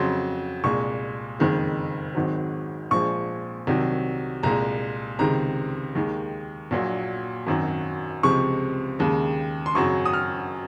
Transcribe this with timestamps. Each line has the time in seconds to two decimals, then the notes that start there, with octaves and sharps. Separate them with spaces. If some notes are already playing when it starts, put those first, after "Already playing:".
Already playing: F2 C#3 F#3 C6
0.64 C2 A#2 G#3 C#6
1.39 F#1 F2 D#3 G#3
2.15 G#1 G#2 D#3 F#3
2.91 A#1 A#2 F3 G#3 C#6
3.67 C2 C3 D#3 F#3
4.43 C2 A#2 G#3 A#5
5.19 C#2 C3 D#3 G#3 A#5
5.95 D#2 D#3 G#3
6.71 A#1 A#2 F#3
7.47 G#1 F#2 D#3 F#3
8.23 C#2 C3 F3 G#3 C#6
8.99 D#2 C#3 G#3
9.66 C6
9.75 G#1 F#2 C#3 F#3 C#6
10.05 D#6
10.13 F6